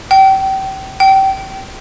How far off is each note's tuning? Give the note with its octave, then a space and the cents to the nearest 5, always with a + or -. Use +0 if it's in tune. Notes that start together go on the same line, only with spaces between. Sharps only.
G5 -30
G5 -25